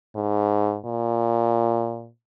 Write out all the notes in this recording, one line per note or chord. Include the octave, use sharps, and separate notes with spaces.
G#2
A#2